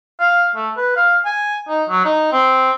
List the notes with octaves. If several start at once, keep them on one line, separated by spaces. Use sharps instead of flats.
F5
A3
B4
F5
G#5
D#4
F#3
D#4
C4